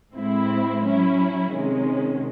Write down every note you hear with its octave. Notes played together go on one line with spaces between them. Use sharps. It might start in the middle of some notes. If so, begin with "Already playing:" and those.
A2 G#3 C4 E4
F#3 C#4 E4
C3 D#3 G#3 C#4